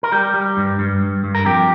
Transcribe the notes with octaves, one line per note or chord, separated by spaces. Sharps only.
A#4
G3 G4
G3
G2
G2
G2
G2
A#4
F2 G4